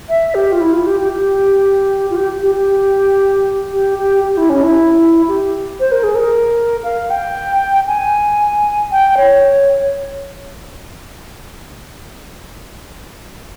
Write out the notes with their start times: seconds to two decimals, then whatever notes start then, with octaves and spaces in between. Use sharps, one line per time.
0.09 E5
0.35 G4
0.52 F4
0.61 E4
0.73 F4
0.87 G4
1.00 G4
1.13 G4
2.11 F4
2.16 G4
2.42 G4
2.55 G4
3.73 G4
3.99 G4
4.24 G4
4.37 E4
4.50 C#4
4.63 E4
5.28 G4
5.80 C5
5.92 A#4
6.03 G#4
6.15 A#4
6.84 F5
7.10 G5
7.87 G#5
8.92 G5
9.17 C#5